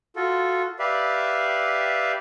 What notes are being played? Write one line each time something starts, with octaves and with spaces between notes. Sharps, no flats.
F4 F#4 A4
G4 B4 D5 E5 F5